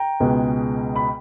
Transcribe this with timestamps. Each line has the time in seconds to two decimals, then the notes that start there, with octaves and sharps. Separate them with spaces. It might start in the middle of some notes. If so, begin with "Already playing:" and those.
Already playing: G5 A#5
0.20 C#2 B2 G#3 B3
0.96 B5